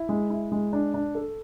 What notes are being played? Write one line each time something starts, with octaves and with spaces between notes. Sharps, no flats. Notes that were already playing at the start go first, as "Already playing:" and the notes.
Already playing: E4
G#3
E4
G#3
D4
D4
A4